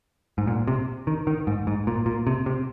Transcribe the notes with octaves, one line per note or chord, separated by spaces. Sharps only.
G#2
A#2
C3
D#3
D#3
G#2
G#2
A#2
A#2
C3
C3